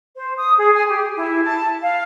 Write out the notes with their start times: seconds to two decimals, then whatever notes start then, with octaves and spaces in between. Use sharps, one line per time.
0.16 C5
0.38 D#6
0.58 G#4
0.76 G#5
0.88 G4
1.17 E4
1.44 A5
1.82 F5